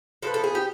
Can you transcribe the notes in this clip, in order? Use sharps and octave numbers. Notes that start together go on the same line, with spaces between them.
F3 G#3 B3 A4
A4
G#4
G4